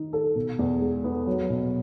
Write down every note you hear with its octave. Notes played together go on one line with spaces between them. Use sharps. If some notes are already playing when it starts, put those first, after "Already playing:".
Already playing: D#3 D#4
A4
B2
E2
G#3
B3
F#3
B2